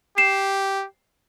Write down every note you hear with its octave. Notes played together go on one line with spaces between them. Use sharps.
G4 C7 E7